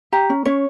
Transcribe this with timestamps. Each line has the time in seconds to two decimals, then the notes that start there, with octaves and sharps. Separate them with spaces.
0.12 G4 A#5
0.30 C#4
0.45 C#4 C#5